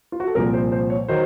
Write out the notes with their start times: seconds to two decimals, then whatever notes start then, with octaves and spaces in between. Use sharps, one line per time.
0.12 F4
0.20 F#4
0.27 A4
0.35 C2 A#2 F3 A#4
0.53 C5
0.72 C5
0.90 C#5
1.08 D#3 F#3 C5